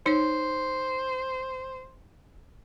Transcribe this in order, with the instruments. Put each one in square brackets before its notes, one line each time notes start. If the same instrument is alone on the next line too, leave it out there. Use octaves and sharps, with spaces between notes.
[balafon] D#4 C#5 [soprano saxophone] C5